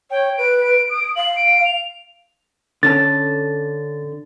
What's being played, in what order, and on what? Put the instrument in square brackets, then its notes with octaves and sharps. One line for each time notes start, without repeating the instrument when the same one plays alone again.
[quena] C#5 [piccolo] G5
[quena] B4 [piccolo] D7
[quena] D#6
[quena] F5 [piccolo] F#7
[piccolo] D7
F7
[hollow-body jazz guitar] D3 C#4 A4 [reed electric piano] A6